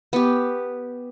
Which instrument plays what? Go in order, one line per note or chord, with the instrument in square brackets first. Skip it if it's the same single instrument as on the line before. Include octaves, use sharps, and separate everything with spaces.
[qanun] B3 G4